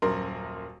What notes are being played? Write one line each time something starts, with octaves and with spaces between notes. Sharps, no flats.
D#1 F#2 A#4 C6